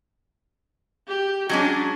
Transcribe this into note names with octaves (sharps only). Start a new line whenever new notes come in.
G4
F#3 G#3 C#4 D4